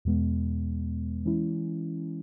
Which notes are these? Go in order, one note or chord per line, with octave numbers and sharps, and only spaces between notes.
E2 B2 G#3 B3
E3 G#3 C#4 E4